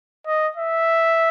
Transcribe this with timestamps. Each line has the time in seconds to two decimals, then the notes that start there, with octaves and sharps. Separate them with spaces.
0.27 D#5
0.56 E5